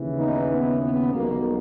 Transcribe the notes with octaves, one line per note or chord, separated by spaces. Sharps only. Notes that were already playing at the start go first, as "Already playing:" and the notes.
Already playing: D#2 C#3 E3
B3 D#4
B3
B3
B1 B2 G3 A#3